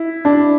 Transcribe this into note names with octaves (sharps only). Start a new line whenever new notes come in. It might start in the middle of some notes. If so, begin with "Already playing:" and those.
Already playing: E4
D4